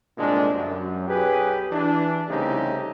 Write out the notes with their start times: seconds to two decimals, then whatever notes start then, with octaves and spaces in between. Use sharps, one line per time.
0.18 C2 A#2 D3 G#3 D4
0.54 F#2
1.08 B1 G4 G#4 B4
1.72 E3 D4
2.29 C2 C#3 A3 C4 D#4 G4